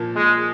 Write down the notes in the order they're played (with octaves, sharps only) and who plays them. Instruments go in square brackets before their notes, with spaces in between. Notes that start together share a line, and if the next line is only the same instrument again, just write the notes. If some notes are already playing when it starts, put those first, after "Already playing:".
Already playing: [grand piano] A#2 F3 A#3
[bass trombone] G#3